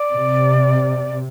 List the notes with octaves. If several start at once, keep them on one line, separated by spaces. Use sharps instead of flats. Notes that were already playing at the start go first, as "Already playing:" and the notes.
Already playing: D5
C3